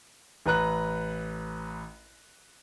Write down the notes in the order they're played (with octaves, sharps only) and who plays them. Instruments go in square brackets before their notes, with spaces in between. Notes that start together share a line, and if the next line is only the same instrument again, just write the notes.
[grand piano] A1 B4 A#5 F#6